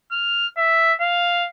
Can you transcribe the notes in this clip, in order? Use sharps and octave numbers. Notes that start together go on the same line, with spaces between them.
F6
E5
F5